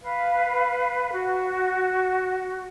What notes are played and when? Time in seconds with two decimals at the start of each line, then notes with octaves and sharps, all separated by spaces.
0.01 B4 F5
1.12 F#4